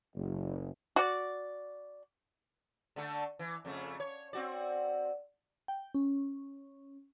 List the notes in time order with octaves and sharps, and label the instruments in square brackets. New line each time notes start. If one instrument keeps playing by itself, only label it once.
[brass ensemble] F#1
[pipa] F#4 D5
[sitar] D3 A3 A4
E3
F2 C#3 A3
C#5
C4 F#4 D5
[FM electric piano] G5
C#4